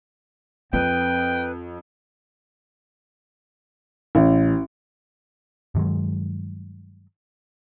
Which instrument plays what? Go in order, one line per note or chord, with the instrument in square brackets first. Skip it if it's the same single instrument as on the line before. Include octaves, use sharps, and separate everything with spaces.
[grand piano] F2 [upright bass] C4 [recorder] B4 [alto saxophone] G5
[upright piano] A1
[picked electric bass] G2 D#3 F#3 G#3